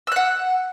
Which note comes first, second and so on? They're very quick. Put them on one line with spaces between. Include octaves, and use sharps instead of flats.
E6 F#6 F#5